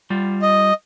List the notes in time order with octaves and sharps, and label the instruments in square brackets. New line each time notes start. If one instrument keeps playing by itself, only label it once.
[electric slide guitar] G3 F4
[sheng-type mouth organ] D#5